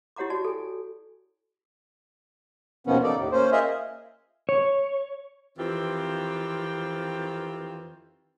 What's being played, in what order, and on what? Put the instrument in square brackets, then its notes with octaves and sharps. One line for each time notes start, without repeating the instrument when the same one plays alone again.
[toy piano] E4 G4 C#5 F#5 A#5 D6
F#4 D5 A5
A4 G#5
[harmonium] D#2 B2 D#3 F3 B3 C#4
D#4 A4 D5
D#2 A2
A#3 C#4 C5
F4 G#4 A#4 D#5 E5
[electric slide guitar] C#5
[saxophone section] F2 D#3 E3 C4 F4 G4